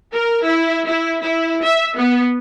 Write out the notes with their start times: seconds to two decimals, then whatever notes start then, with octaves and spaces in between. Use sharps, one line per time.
0.13 A#4
0.44 E4
0.86 E4
1.20 E4
1.64 E5
1.95 B3